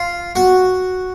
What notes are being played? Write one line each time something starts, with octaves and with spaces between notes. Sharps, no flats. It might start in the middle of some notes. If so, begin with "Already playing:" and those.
Already playing: F4
F#4